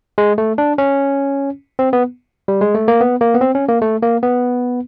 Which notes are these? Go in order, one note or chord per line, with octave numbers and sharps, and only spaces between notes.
G#3
A3
D4
C#4
C4
B3
G3
G#3
A3
A#3
B3
A#3
B3
C4
C#4
A#3
A3
A#3
B3